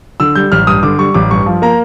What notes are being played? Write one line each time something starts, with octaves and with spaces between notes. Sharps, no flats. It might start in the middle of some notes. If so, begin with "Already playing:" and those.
D3 E6
G3 G6
A1 F6
G2 D#6
D3 D6
G3 C#6
A1 D6
G2 C#6
F3
A#3 A#5